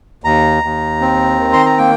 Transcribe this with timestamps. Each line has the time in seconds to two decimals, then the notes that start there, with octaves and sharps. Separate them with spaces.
0.24 D#2 A#5
0.63 D#2
1.01 C4
1.40 D#3
1.53 C6
1.66 A#5
1.78 A#3 G5